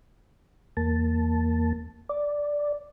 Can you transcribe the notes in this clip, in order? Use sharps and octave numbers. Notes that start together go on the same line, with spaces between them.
E2 A#3 A5
D5